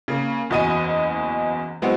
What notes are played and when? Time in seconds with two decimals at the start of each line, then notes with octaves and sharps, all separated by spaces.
0.08 C#3 A#3
0.50 F#1 E2 F#4 D#5 G#5 D#7
1.82 F#3 G#3 B3 C4 E4 F#4